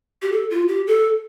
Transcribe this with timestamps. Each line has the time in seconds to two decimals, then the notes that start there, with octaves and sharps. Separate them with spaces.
0.22 G4
0.32 A4
0.50 F4
0.68 G4
0.87 A4